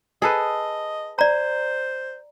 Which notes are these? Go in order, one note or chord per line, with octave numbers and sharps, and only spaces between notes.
G#4 A4 B4 D#5
C5 D5 A#5